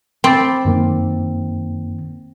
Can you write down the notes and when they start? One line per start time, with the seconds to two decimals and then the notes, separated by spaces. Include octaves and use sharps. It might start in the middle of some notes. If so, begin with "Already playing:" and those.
0.24 C4 B5 D6 A6
0.65 F#2 D#3 A#3